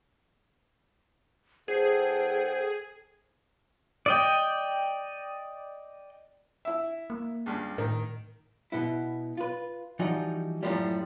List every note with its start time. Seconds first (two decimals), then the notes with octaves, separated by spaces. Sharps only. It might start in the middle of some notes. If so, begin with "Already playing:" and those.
1.68 E2 G#4 A4 C5 F#5 G5
4.06 D5 D#5 G5
6.65 E4 E5
7.10 A#3
7.46 C#2 G2
7.78 A2 D#3
8.72 B2 B3 E4
9.37 F4 B4
9.99 E3 F3 G3 D#4 F#4
10.63 F#2 A2 D#3 F3 G3